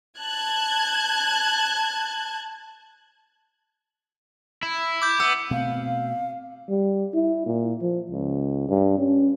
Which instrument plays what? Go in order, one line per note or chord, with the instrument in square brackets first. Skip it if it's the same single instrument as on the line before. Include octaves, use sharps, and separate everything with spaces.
[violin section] A5 F#6 G#6
[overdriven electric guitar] E4
[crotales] D6 G6
[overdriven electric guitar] B3 [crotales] E6
[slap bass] B2 A3 [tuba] C4 [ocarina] F5
[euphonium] G3
E4
A#2
F3
C#2
G2
C#4